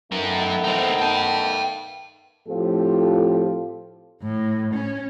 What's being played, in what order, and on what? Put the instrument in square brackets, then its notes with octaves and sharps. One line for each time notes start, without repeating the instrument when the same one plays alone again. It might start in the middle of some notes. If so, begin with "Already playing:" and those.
[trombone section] D#3 A3 B3 [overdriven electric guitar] F#3 A#4
[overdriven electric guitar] C4 D#4
G5 A5
[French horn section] A2 F3 C4 F4 G4 A4
[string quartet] A2
C#4